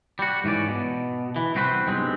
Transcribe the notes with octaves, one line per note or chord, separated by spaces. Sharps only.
G3 F#4
G#2 E3 C#4 D5
B2
E3
C2 C4 F#4 B4 C5
B1 G2 G#3 C4